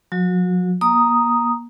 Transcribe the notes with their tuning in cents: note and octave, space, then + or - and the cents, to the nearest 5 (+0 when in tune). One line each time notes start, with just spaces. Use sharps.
F#3 -45 F#4 -20
A#3 +35 A#5 +0 D#6 +0